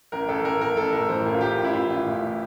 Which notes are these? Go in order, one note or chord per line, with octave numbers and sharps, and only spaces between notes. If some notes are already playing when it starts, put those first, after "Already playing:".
A1 A#4
A1 A4
A1 A#4
A1 A#4
A1 A4
A2 A#4
E3 C5
A1 A#4
F4
A2 G4
A1
E4
A1 F4
A1
A2
A2